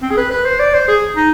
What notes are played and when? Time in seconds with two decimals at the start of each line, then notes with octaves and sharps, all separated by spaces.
0.02 C4
0.11 G#4
0.17 B4
0.31 B4
0.45 C5
0.59 D5
0.74 C5
0.88 G#4
1.17 D#4